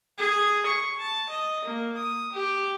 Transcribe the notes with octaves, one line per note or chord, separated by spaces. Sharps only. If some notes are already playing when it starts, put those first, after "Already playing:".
G#4
C#6
A5
D#5
A#3
D#6
G4